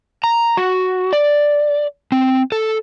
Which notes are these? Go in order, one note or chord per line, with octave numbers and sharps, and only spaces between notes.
A#5
F#4
D5
C4
A4